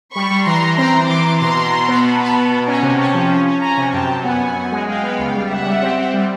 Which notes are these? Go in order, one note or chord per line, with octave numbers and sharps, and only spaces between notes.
G3 B5 C#6
G3
E3 A#5 C6
E3
C4 A#5 C6
E3
E3 C6 D6
E3
B2 A#5 C6
B2
B2
B3
B2 A5 B5
B3
B2
B2
C#4 G#5 A#5
C3
C#4 G5 A5
F3
C#4
C#4
C#4 G#5 A#5
C3
F#2 G5 A5
F#2
B3 F#5 G#5
F#2
F#2
G#3
G#3 F5 G5
B3
C#2
G3
C#2 E5 F#5
G3
C4
C4
G3